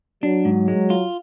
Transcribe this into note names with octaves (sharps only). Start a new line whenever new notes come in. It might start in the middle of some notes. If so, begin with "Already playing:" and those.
F#3 D4
G#2
G#3
F4